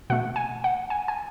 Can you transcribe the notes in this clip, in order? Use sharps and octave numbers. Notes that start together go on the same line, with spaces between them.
B2 A3 F#5
G#5
F#5
G#5
G#5